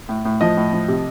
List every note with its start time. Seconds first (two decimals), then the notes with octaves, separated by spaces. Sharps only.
0.09 A2
0.25 A2
0.41 F3 D#5
0.57 A2
0.73 F3
0.88 C3